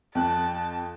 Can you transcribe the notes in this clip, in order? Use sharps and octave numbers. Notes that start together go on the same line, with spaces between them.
F2 A5 F#6